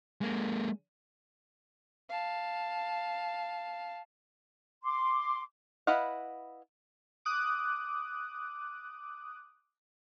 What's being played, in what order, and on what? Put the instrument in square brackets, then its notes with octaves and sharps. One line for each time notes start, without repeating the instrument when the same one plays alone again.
[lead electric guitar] G#3 A#3
[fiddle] F5 A5
[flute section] C6 D6
[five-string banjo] E4 B4 D#5 F5 F#5
[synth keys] D6 D#6 F#6